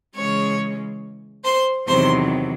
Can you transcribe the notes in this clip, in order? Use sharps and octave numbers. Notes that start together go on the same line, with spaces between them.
C#3 E3 G#3 C#4 C#5 C#6
C5 C6
E2 C3 D#3 F#3 C5 C6